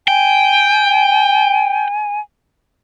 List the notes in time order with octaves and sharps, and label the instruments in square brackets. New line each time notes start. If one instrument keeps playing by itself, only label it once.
[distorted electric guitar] G5 [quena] G#5